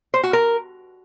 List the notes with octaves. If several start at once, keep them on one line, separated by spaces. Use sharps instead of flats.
C5
F#4
A#4